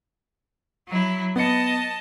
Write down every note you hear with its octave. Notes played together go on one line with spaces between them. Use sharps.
F#3 E4
B3 D#5 A5 C#7